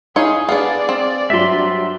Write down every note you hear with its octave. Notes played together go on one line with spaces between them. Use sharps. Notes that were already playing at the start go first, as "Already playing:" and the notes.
D#4 E4 G#4 C#5 F5 C6
B3 D4 G#4 D5 F5
C4
G2 F#3 E5 C6